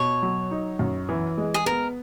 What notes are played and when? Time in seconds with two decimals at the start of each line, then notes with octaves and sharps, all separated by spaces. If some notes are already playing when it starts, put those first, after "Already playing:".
Already playing: B2 C#5
0.23 F#3
0.51 D#4
0.79 F#2
1.09 E3
1.38 G#3
1.54 G#4
1.66 B3 A#4